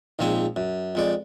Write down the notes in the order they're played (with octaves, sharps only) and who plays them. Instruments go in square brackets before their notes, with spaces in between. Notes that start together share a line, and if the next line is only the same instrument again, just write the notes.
[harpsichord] A#1 G#2 F3 C4 G#5
F#2
F2 G#3 D5